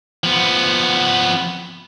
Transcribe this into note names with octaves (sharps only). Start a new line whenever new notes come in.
F3 B3